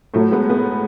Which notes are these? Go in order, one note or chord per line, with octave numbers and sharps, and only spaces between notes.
A2 F#3 A3
G#3 B3
G#3 B3